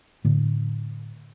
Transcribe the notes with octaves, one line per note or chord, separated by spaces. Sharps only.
A2 D3 D4